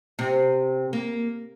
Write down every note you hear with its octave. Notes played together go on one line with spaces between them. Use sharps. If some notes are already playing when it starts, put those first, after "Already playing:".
C3
A#3